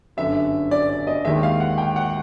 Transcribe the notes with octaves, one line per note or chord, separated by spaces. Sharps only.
G1 F#2 D3 E5
D5
D5
D#5
D#2 D#3 G#3 E5
F5
F#5
G5
F#5